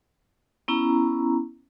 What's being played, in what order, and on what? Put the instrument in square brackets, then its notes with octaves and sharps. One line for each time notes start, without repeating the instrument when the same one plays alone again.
[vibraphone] B3 C#4 E4 A#5